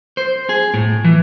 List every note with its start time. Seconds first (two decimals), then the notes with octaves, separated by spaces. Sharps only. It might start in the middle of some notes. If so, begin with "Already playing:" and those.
0.17 C5
0.49 G#4
0.74 A2
1.04 E3